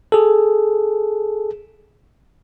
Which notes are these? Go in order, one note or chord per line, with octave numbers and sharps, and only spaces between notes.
G#4 A4